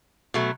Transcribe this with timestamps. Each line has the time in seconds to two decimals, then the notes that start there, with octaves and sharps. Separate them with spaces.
0.34 B2 F#3 A3